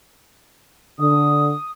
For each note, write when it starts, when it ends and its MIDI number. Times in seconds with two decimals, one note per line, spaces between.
0.99 1.51 50
0.99 1.69 87